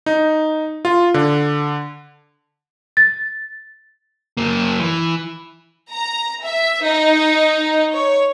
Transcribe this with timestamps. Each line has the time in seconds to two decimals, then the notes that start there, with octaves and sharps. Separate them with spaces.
0.06 D#4
0.85 F4
1.14 D3
2.97 A6
4.37 F#2 A#3
4.80 E3
5.91 A#5
6.44 E5
6.84 D#4
7.94 C#5